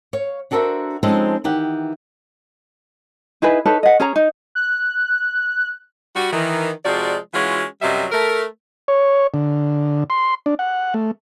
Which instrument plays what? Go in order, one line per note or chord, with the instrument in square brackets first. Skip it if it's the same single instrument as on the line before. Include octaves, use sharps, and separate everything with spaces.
[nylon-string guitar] C#5 F5
D4 F#4 A4 A#4 C5 E5
F3 G#3 C4 C#4 D#4 A4
D#3 E3 G4 F#5
[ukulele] D#4 E4 G#4 B4
D#4 A4 B4 C#5
D#5 F#5
C#4 G#4 C#5 A#5
D#4
[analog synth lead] F#6
[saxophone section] G3 F#4
D#3 E3
C3 F3 G#3 F#4 D5
E3 G#3 C#4 F4 F#4
F#2 C3 F#3 G3 D#5 E5
A3 A#4
[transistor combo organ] C#5
D3
C6
D4
F#5
A3